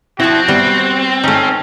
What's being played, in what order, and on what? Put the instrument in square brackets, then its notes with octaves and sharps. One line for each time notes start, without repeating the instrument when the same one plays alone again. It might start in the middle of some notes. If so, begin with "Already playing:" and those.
[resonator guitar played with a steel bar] F3 E4 [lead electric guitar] C4 [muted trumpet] F#4
[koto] G3 [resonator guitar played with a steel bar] B3
[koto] A3 D#4 [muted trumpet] C#4